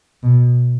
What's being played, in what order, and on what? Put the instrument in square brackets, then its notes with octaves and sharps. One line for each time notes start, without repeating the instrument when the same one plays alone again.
[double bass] B2